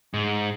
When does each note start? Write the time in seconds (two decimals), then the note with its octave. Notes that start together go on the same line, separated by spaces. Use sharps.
0.14 G#2